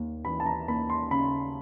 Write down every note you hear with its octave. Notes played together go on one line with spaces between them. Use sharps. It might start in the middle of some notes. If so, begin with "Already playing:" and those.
Already playing: D#2
E3 B5
A5
A#5
D#2 B5
C6
C#3 B5